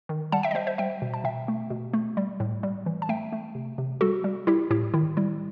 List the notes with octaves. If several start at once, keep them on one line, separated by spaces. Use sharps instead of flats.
D#3
G3 F#5 A5
E5 G5
D#5
G3 C5 E5
C5 E5
G3 E5 G5
B2
A5
B2 E5 G5
A3
B2
A3
G3
A2
G3
E3
A5
A3 E5 G5
A3
C3
C3
G3 F#4 A4
G3
G3 E4 G4
A2 E4 G4
D#3 E4
G3 E4